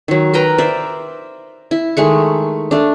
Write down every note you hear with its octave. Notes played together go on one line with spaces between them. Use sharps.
D#3 F#3
A#4 B4 G5 A#5
C5 D5 E5
E4
D#3 G#3 A3 C#6
A3 D4